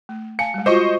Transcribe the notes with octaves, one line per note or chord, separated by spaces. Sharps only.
A3
F5 G#5 A5 C#7
G3 G#3
F4 F#4 C5 D#5 C#6 D6